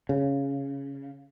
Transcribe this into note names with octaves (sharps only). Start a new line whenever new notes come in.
C#3